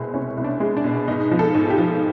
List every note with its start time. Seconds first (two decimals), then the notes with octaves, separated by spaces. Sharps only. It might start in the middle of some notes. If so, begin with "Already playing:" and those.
Already playing: C2 B2 G#3 C4
0.13 C2 C#4
0.37 C2
0.44 D4
0.60 G#3
0.77 D4
0.84 B2
1.08 G#2 D#4
1.31 F3
1.39 A4
1.55 G#2
1.70 G4
1.78 F3